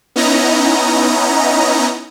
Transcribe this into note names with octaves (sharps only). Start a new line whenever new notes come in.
B3 C#4 D#4 E4 D#5 A#5